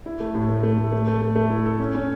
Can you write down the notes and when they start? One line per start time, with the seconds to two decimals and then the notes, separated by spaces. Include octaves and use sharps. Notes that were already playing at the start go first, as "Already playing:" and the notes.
0.06 E4
0.20 A3
0.35 A2
0.49 A3
0.63 A3
0.78 A2
0.92 A3
1.07 A3
1.21 A3
1.36 A3
1.50 E4
1.66 A4
1.80 C#4
1.95 C#4